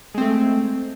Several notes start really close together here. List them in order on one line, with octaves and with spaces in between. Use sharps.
G#3 C4 A3